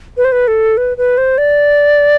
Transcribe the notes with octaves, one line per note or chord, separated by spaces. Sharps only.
B4
C5
B4
A4
B4
B4
C5
D5